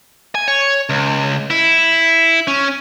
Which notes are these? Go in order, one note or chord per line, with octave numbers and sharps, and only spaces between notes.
G#5
C#5
C#2
E4
C#4